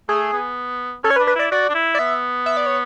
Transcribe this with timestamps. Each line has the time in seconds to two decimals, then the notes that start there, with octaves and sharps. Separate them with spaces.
0.09 A3 G#4
0.33 B3
1.04 C#4 A4
1.10 C#5
1.16 B4
1.20 D4
1.27 B4
1.35 E4 D5
1.52 F#4 D5
1.69 D4
1.74 E4
1.95 D5
1.99 B3 E5
2.46 E5
2.57 D5
2.66 C#5